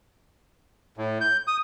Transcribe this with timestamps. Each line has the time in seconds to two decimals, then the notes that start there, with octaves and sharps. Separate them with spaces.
0.98 A2
1.21 G6
1.47 D#6